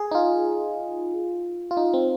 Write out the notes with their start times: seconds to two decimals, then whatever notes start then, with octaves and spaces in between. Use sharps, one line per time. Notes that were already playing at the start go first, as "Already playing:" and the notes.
Already playing: G#4
0.11 D#4
0.15 F4
1.71 F4
1.77 D#4
1.94 C4